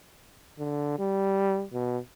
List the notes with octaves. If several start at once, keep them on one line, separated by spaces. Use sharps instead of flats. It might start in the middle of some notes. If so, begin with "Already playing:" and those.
D3
G3
B2